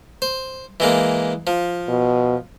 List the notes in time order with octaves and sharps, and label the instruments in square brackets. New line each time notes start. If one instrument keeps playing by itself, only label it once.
[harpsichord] C5
E3 G#3 A#3
F3
[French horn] B2